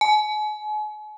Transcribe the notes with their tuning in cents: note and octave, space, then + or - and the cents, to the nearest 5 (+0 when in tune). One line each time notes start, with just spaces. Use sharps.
G#5 +40